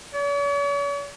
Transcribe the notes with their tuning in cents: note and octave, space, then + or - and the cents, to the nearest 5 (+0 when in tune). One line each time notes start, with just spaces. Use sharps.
C#5 +45